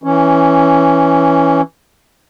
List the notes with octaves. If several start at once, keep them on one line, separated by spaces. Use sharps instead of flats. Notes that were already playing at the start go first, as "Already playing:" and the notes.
E3 C#4